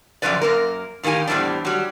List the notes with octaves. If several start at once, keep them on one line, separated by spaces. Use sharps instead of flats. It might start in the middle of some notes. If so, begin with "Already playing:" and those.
F#2 A#2 D3 F3 B4 D5
F#2 A#3 A#4
A2 D#3 A#3 G4 G#5
E2 A2 G3 C4 D4
F#3 G3